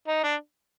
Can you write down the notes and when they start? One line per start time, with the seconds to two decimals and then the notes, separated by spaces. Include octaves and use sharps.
0.08 D#4
0.23 D4